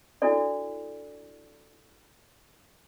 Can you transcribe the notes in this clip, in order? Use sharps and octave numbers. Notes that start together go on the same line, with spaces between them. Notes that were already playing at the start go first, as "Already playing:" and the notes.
D4 E4 F#4 A4 D5